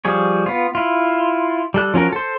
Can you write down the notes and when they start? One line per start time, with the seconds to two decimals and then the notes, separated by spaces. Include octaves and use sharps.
0.05 F3 G3 G#4 C#5
0.46 B3 F4
0.75 E4 F4
1.74 G3 A4 F#6
1.94 F3 C#4 F#4 A#4
2.13 A4 C5